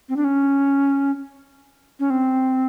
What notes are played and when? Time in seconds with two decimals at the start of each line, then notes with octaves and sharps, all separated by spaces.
0.09 C4
0.17 D4
0.24 C#4
2.00 C#4
2.10 C4